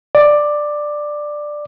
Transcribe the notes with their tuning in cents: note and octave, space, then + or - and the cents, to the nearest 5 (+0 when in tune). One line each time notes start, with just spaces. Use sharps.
D5 +10